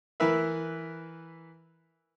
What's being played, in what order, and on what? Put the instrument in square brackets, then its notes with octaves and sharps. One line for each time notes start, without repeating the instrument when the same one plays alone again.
[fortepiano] E3 A#4 B4 E5